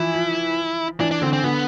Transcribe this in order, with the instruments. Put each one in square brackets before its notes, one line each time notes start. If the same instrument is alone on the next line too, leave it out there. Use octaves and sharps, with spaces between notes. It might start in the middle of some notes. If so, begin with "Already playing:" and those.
Already playing: [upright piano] E3 F3 [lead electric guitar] E4
[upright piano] F3
[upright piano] E3 [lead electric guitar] D4
[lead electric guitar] D4
[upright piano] D3 [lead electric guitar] C4
[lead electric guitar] C4
[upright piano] D3 [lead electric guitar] B3